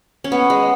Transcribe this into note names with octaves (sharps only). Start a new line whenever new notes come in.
C#4
B3
G#3